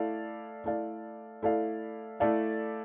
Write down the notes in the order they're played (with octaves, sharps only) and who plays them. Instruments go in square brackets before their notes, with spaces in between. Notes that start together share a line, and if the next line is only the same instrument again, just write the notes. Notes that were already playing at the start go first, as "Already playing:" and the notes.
Already playing: [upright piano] A3 E4 A4 D5 F5
A3 E4 A4 D5 F5
A3 E4 A4 D5 F5
A3 E4 A4 D5 F5